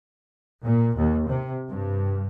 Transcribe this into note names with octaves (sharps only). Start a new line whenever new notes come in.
A#2
D#2
C3
G2